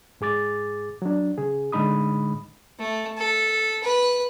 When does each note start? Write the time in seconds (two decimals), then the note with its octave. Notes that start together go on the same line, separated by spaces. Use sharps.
0.21 G#2 G#4 D6 A6
1.02 F#3 D4
1.38 C#3 G#4
1.72 A2 D3 G#3 D#4 B5 D#6
2.79 A3
3.17 A4
3.83 B4